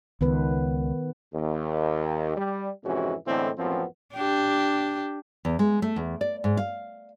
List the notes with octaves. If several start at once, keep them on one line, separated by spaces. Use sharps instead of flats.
C#2 D#3 B3 B4
D#2
G3
F2 G#2 C3 E3 C#4 F#4
A2 D3 E3 G#3 B3 C4
A1 F#2 F3 B3 C4
D4 G4
E2
G#3
A3
E2
D5
G#2
F5